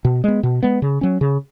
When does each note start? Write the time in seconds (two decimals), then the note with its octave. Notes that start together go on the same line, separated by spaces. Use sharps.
0.05 B2
0.24 G#3 B3
0.43 B2
0.63 G#3 B3
0.82 C#3
1.01 F#3 C#4
1.21 C#3